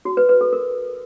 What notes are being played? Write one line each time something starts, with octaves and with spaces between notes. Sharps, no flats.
F#4
B4
B4
A4
A#4